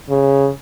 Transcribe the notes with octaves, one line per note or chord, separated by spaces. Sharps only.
C#3